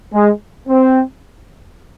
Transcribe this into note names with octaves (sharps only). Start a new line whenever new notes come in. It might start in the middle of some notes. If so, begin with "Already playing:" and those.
G#3
C4